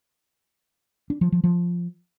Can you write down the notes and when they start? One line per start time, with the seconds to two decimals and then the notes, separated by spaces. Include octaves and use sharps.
1.10 D4
1.21 F3
1.32 F3
1.44 F3